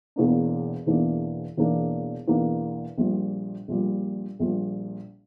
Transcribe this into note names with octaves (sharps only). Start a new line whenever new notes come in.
E1 E2 E3 A#3 D4
E1 E2 E3 A#3 D4
E1 E2 E3 A#3 D4
E1 E2 E3 A#3 D4
A#1 A#2 G3
A#1 A#2 G3
A#1 A#2 G3